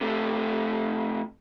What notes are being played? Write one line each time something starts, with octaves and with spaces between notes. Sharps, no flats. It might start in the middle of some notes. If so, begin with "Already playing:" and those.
C3 A3